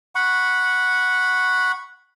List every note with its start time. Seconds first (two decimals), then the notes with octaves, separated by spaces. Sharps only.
0.15 F#5 B5 C#6